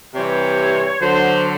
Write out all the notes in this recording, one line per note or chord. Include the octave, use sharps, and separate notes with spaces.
C3 E3 G3 C#5
D3 F#3 C5